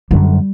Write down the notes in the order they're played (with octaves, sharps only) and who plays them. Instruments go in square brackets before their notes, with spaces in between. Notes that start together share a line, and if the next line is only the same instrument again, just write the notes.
[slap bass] F#2 D3 F#3 [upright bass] G3